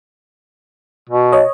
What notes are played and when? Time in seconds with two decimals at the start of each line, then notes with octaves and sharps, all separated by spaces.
1.09 B2
1.32 C#5 D#5